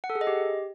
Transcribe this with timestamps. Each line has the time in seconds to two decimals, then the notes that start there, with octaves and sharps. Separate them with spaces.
0.04 F#5
0.10 A4
0.15 G#4
0.21 D#5
0.27 G4